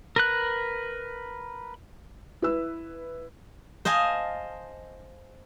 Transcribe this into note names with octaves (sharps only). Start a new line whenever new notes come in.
A#4 B4 F#6
E4 B4 E6
C5 D#5 F5 G#5 A5